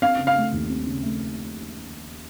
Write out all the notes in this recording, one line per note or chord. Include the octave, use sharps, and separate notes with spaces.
C4 F5
C#3
F5
A3
D#2
C4
C#3
A3